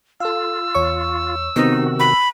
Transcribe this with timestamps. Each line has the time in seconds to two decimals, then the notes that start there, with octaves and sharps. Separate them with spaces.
0.20 F4 A4 F5 E6
0.74 E2 C#5 C#6
1.56 C3 D#3 B3 C4 D#4 F#4
2.00 B5